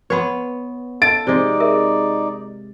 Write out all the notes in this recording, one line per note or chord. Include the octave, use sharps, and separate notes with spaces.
B3 B4 C#5 F#5 C6
A4 A6 D7
C3 G#3 D#4 D5
G#4 A#4 E5